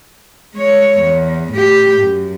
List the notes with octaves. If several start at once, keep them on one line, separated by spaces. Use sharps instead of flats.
G#3 C#5
E2
A2 G4
F#2